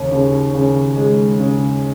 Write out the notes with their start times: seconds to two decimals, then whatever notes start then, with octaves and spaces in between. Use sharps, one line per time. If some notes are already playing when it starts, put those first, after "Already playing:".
Already playing: D#2 C#3
0.12 C#3
0.54 C#3
0.96 G#3
1.40 C#3